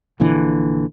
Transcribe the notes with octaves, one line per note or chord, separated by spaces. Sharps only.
A#1 A#2 D3 E3